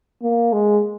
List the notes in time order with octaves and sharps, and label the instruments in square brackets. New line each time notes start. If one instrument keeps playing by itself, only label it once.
[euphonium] A#3
G#3